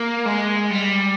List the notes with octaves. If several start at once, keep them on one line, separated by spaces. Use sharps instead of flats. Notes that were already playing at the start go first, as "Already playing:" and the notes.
Already playing: A#3
G#3
G3